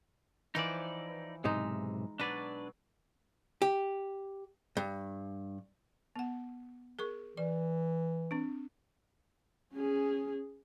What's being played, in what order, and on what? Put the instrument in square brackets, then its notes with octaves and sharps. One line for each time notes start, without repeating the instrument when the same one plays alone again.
[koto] E3 F3 E4 [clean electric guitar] D#4 D5
[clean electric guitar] B1 G#2 C3 [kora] G#3 D#4
[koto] B2 F#3 [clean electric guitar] D4 B4 D5
[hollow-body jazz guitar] G4
G2
[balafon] B3 F#5
G#4 A#4 C#6
[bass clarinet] E3 [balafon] D5
[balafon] C4 D4
[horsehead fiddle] C#4 G#4